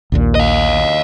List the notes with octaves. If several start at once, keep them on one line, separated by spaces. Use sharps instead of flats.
A#1 D#2 A#2
D#5 F5